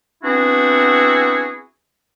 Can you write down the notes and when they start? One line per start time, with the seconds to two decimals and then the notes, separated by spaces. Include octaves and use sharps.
0.24 B3 C4 D4 E4 F#4 G#4